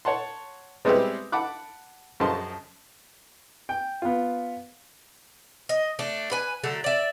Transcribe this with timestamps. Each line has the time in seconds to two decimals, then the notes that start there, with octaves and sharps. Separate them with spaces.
0.05 C#5 F#5 A5 C6
0.85 G3 G#3 B3 C4 E4 G4
1.32 F#5 A5 B5 D6 F#6
2.20 F#2 C#3 F3 D#5 A5 C6
3.69 G5
4.02 B3 F4
5.69 D#5
5.99 A3 D4
6.31 B4 G#5
6.64 D3 F#3 A3
6.84 D5 E5